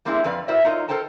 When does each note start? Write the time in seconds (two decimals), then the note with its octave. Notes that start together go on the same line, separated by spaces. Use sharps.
0.05 G3 A#3 C4 D4 E4 G#4
0.24 F2 F3 B4 D5 F5
0.48 E4 F#4 A#4 C5 D5 E5
0.63 F#3 D#4 F4 A#4 C#5 D#5
0.88 A4 A#4 C5 G5 A5 A#5